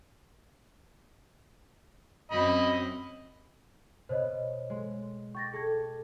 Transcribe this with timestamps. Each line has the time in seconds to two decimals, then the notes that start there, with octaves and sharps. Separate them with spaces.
2.31 F#2 C4 D#5 B5
4.09 B2 C5 C#5 D#5
4.70 G#3
5.35 G5 C#6 D6 A6 A#6
5.53 G#4 A4 G#6